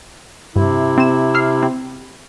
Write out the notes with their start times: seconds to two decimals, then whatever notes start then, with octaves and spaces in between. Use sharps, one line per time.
0.56 G2 C3 E4
0.98 C4 E7
1.34 E6 F6 C7
1.63 C4